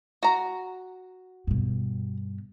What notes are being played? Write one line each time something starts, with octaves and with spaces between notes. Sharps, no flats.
F#4 A#5
G2 B2